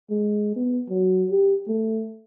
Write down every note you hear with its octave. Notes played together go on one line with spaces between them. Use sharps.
G#3
B3
F#3
G4
A3